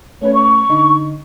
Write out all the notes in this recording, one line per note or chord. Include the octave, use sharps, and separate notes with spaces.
A3 C#4 B4 C#5
C#6
D3 D#4